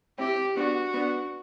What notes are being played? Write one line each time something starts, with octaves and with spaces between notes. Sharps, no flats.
C4 E4 G4
B3 D4 F#4
B3 D4